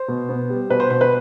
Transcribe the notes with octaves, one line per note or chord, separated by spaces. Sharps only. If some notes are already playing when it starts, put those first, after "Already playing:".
Already playing: C5
B2
B3
G3
B2 B4
C5
B2 C5
B4